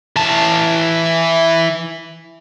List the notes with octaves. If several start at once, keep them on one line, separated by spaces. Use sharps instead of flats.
E3 A5